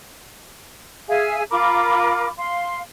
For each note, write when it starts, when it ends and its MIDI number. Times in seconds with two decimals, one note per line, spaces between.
1.08 1.42 68
1.08 1.42 76
1.08 1.42 77
1.08 1.42 80
1.50 2.28 65
1.50 2.28 70
1.50 2.28 83
1.50 2.28 86
2.37 2.80 77
2.37 2.80 84